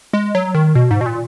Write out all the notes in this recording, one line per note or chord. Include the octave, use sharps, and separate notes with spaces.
G#3
F#3
D#3
B2
G#2
B2
A#2